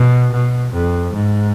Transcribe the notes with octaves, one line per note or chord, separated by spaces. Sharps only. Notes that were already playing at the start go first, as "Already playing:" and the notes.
Already playing: B2
B2
F2
G#2